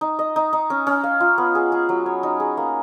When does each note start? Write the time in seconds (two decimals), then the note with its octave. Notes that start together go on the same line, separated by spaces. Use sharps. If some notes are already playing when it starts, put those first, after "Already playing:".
0.01 D#4
0.19 D#5
0.36 D#4
0.53 D#4
0.70 C#4
0.87 C#4
1.04 F5
1.20 F4
1.38 B3
1.55 G#4
1.72 G#4
1.89 F#3
2.06 C#5
2.23 D#4
2.40 G#4
2.57 A#3